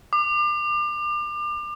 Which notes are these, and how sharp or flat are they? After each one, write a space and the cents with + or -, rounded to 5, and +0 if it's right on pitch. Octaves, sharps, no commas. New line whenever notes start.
D6 +35